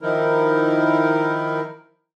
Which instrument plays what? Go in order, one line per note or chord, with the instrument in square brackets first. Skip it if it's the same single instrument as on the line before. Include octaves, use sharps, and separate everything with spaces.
[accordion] D#3 F3 D#4 E4 A#4